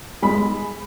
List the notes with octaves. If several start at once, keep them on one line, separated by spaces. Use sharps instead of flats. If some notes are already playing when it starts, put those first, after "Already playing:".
G#3 B5